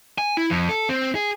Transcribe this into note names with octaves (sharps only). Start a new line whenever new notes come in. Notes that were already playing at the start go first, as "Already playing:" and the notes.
G#5
E4
F2
A4
C4
G#4